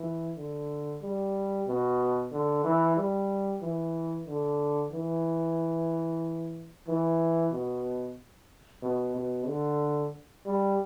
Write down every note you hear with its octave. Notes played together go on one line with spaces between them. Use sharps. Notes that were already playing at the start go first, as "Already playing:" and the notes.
Already playing: E3
D3
G3
B2
D3
E3
G3
E3
D3
E3
E3
B2
B2
B2
D3
G3